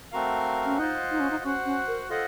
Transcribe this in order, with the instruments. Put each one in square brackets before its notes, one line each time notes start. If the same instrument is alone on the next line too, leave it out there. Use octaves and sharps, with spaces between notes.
[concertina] A3 C4 F#4 A#4 F5
[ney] C#4
[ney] D#4 [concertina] F4 C5 D#5 F#5
[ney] D#4
C#4
D#4
[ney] C#4 [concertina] F#4 C5 F#5
[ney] C#4
A#4
[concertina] F4 C5 D#5 F#5 [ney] A4